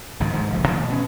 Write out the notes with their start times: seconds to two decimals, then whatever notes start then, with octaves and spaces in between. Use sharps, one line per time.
0.20 G#1 C#2 G2 D#3
0.33 G#2 D3 F3
0.50 F1 A#1
0.68 B2 E3 G3 A3
0.89 B2 C#4